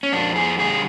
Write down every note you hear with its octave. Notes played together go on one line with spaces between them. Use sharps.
C#4
F2 D4
G#4
D3 G3 G#4